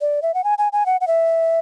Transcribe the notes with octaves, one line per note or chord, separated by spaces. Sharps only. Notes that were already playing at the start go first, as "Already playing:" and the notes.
D5
E5
F#5
G#5
G#5
G#5
F#5
F#5
E5